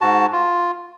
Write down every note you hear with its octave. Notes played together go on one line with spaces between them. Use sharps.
G#2 F#4 A5
F4